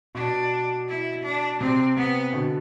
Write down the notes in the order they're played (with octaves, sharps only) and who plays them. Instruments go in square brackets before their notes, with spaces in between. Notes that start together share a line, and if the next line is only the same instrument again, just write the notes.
[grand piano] B2 [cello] D4
[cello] E4
D4
[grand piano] C3 [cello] C4
[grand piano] C3 [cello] B3
[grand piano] B2 D3